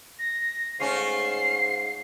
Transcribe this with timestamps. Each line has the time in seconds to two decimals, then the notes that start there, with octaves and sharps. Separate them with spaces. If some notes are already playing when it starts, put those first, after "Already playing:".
0.19 A#6
0.80 G#2 A3 C#4 F4 C7